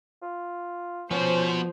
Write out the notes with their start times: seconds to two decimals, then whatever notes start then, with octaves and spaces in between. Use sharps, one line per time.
0.22 F4
1.11 F3 B3 C#4 F#4 C5